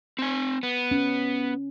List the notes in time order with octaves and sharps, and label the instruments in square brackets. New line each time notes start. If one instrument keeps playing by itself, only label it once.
[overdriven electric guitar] C4 G#5
B3
[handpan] C#4